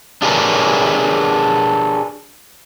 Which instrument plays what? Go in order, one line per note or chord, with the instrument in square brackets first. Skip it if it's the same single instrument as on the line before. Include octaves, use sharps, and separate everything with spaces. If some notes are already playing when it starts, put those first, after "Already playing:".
[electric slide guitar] D4 G4 G#4 A#4 B4 C#5